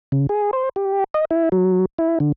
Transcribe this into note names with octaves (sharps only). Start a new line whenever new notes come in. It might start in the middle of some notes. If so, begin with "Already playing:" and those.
C#3
G#4
C5
G4
D#5
E4
F#3
E4
D3